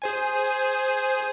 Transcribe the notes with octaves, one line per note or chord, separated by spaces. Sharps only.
G#4 C5 G#5